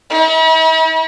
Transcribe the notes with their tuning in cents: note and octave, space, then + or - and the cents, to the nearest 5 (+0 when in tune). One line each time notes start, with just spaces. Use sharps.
E4 -45